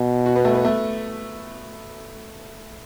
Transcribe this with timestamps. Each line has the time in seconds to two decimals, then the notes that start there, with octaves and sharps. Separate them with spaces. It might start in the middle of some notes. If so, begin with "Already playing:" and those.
Already playing: B2
0.26 F#4
0.36 B3
0.45 A3
0.55 B3
0.65 A3